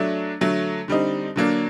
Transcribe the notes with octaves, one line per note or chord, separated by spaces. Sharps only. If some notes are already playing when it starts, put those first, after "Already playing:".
Already playing: F#3 A3 D4
D3 F#3 A3
D3 G3 C4 D#4
D3 F#3 A#3 D4